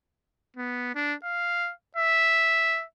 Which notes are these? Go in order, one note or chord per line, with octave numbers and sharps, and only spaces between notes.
B3
D4
F5
E5